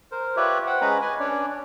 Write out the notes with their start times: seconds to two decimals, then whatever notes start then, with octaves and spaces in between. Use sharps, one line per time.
0.11 A#4 C5
0.37 F4 G4 B4 C#5 D5 E5
0.67 C5 F#5 G5
0.81 G#3 C#4 B4 A#5 B5
1.01 B4 G#5
1.20 C#4 D4 C#5 D5